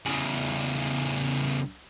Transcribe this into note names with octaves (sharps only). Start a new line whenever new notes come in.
E2 C#3